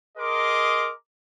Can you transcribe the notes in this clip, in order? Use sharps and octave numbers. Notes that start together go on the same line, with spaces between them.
G#4 A#4 D#5 C6 D6